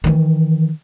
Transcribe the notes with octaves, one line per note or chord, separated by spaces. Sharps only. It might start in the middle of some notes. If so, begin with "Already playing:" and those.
D#3 E3